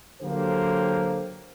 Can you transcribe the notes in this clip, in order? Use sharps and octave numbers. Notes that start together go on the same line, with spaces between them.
D3 F#3 A#3 G4 A4 C5